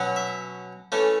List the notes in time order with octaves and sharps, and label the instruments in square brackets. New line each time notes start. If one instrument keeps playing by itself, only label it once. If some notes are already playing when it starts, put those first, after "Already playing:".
Already playing: [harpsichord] B2 F#3 C#4
E5
E3 A3 C#4